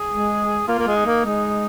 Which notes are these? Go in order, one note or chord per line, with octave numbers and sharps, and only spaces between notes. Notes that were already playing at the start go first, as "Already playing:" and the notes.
Already playing: G#4
G#3
A#3 F4
A#3
G#3
D#4
A#3
G#3 D#4